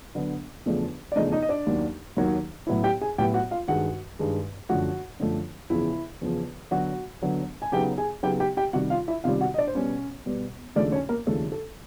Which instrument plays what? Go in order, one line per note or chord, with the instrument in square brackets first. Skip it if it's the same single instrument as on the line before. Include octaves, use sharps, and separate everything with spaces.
[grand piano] D3 F#3 B3 D4
E2 C#3 F3 A3 D4
D5
E2 C#3 F3 A3 D4 D#4 D#5
D#4 D#5
D#5
D4 D5
D#2 D#3 F#3 A#3
D#2 D#3 F#3 A#3
A2 F#3 B3 E4
G4 G5
G#4 G#5
A2 F#3 B3 E4 G4 G5
F#4 F#5
F4 F5
G2 D#3 G#3 F#4 F#5
G2 D#3 G#3
F#2 D3 F3 A3 F#4 F#5
F#2 D3 F3 A3
E2 C#3 F3 E4 E5
E2 C#3 F3
D3 F#3 B3 F#4 F#5
D3 F#3 B3
G#5
C#3 F#3 B3 D#4 G4 G5
G#4 G#5
C#3 F#3 B3 D#4 G4 G5
G4 G5
G4 G5
C3 D#3 G3 F#4 F#5
F4 F5
E4 E5
C3 D#3 G3 F4 F5
F#4 F#5
D#5
D4 D5
C5
B2 G3 B3 C#4 C#5
B2 G3 B3
D#2 C#3 F3 A3 D4 D5
C#4 C#5
A#3 A#4
D#2 C#3 F3 A3 D4 A4
A4